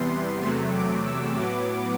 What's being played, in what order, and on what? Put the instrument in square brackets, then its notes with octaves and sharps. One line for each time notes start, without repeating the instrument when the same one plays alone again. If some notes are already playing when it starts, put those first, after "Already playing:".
Already playing: [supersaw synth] E2 C3 E3 G3 B3 C6
C6
E2 C3 F#3 A3 C6
D6
E6
A2 F#3 B3 D6